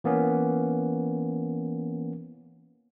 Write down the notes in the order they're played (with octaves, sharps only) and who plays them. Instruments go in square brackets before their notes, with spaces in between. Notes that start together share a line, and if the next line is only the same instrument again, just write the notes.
[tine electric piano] E3 A#3 B3 C#4